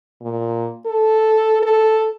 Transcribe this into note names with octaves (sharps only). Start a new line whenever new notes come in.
A#2
A4
A4